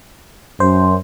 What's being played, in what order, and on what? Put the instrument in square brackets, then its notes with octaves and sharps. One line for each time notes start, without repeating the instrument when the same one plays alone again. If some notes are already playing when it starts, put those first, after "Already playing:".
[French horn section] F#2 [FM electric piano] C5